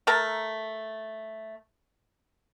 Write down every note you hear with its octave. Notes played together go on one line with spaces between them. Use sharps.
A3 A#4 A5 A#5